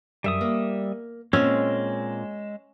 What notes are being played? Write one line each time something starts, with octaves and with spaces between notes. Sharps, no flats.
F#2 G3 E5 D#6
A#3
A#2 G#3 C4 C#4 E6